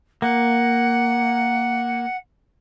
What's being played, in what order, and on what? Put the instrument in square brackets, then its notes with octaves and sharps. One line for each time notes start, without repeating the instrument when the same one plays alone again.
[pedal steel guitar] A#3 [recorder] F#5